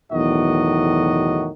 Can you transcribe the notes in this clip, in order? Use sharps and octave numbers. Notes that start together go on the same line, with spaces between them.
B1 E2 A2 D#3 F#4 D#5